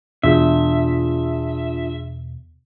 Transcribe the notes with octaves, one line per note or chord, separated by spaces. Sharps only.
E2 B2 D4 F4 G#4 E5